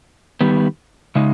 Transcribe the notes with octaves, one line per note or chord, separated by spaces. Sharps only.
D#3 G3 B3
C#3 G#3 D#4